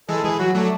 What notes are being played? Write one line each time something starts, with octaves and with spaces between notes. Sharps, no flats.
E3 G#3 A4
E3 G#4
F#3 F#4
F#3 A3 D4